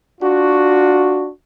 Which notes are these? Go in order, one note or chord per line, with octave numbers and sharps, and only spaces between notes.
D4 F4 F#4